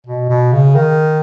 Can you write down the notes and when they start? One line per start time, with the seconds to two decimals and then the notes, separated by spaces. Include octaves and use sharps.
0.07 B2
0.29 B2
0.53 C#3
0.75 D#3